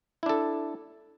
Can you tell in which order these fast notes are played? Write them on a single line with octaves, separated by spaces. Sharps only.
E4 D4 A4